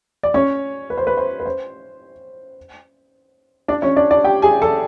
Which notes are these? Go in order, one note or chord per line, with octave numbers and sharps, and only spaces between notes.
D5
C#4 C#5
B4
C5
B4
C5
B4
C5
D4 D5
C#4 C#5
D4 D5
D4 D5
G4 G5
G#4 G#5
A4 A5